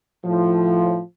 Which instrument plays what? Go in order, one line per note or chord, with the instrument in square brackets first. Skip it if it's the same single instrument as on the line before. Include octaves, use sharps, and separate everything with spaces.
[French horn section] A2 F3